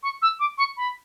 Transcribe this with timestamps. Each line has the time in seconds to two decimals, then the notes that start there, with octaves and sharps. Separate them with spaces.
0.03 C#6
0.22 E6
0.40 D6
0.58 C#6
0.77 B5